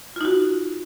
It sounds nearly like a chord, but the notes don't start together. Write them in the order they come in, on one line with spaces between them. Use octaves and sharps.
F4 D#4 F#4